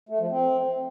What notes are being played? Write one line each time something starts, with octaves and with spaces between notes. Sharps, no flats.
A3
F3
C4